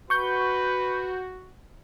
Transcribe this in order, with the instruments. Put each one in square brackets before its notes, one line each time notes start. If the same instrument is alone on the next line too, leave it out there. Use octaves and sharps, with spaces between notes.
[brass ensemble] F#4 [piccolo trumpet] B4 [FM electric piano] C#6 G6